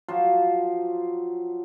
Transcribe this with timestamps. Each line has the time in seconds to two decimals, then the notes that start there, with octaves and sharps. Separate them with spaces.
0.08 F3 F#3 F4 C5